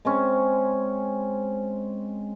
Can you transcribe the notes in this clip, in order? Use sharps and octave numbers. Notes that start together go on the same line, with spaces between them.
G#3 C4 C#4